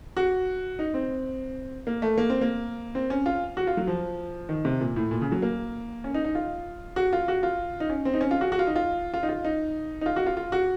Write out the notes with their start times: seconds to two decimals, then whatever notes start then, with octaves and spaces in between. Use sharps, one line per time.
0.17 F#4
0.79 D#4
0.94 C4
1.87 A#3
2.02 A3
2.18 A#3
2.30 C4
2.41 A#3
2.95 C4
3.10 C#4
3.26 F4
3.57 F#4
3.67 F4
3.77 F#3
3.87 F3
4.49 D#3
4.65 C3
4.80 A#2
4.96 A2
5.11 A#2
5.21 C#3
5.32 F#3
5.42 A#3
6.04 C#4
6.14 D#4
6.24 D#4
6.35 F4
6.96 F#4
7.13 F4
7.28 F#4
7.43 F4
7.80 D#4
7.90 C#4
8.05 C4
8.14 D#4
8.21 C#4
8.31 F4
8.41 F#4
8.52 F#4
8.59 F4
8.67 D#4
8.76 F4
9.14 F4
9.23 D#4
9.29 F4
9.45 D#4
10.01 D#4
10.06 F4
10.16 F#4
10.26 F4
10.37 F4
10.52 F#4